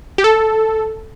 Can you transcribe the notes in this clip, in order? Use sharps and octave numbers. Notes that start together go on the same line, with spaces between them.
G4
A4